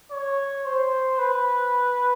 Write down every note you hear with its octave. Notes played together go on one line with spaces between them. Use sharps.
C#5
C5
B4